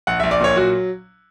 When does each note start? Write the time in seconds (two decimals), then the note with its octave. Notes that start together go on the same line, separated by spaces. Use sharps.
0.07 A#1 F#5
0.20 A#1 E5
0.31 D5
0.41 A#2 C#5
0.56 F#3 F#4